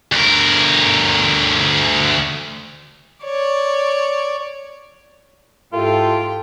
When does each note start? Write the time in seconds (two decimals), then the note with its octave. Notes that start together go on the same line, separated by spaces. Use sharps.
0.12 D2 A#4
3.23 C#5 D5
5.73 G#2 E4 F4 G4 A4 G5